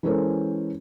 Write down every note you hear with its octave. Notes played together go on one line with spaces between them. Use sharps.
E3 G#3 C#4 A4 A#4 C5